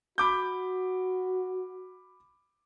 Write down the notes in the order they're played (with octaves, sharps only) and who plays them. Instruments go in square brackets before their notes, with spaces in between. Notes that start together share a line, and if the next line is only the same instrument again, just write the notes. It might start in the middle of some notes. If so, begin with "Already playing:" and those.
[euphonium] F#4 [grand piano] B5 D6 G6